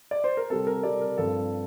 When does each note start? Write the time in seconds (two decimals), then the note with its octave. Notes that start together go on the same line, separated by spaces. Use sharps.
0.11 D5
0.24 C5
0.37 A#4
0.50 C3 G3 C4 A4
0.67 A#4
0.83 C3 G3 C4 D5
1.01 A#4
1.18 G2 F3 C4 A4